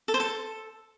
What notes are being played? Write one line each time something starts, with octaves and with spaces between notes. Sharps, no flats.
A4
C5
A4